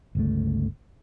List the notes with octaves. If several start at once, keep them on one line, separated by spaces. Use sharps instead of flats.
G1 C#2 A3